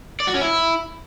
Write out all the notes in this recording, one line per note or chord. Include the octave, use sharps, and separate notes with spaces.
D5
F#4
C#4
E4